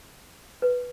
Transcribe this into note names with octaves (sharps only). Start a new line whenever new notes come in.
B4